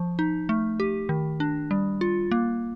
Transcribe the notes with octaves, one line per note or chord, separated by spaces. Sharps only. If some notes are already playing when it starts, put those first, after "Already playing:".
Already playing: F3
D#4
A3
G4
D#3
D4
G3
F4
A#3